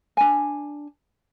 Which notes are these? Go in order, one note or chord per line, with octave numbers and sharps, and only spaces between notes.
D4 G#5